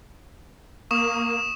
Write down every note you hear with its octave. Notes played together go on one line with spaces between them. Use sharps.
A#3 C#6 D#6 E7